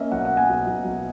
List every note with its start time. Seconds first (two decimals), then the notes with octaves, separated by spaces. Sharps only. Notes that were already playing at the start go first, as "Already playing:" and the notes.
Already playing: A#3 C#4 D#5 E5
0.12 B1 F#5
0.25 F#5
0.31 A#3
0.37 G#5
0.49 B1
0.67 B1
0.85 B1